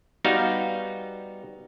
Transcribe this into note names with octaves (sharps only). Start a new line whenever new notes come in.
G3 B3 D#4 F#4 F5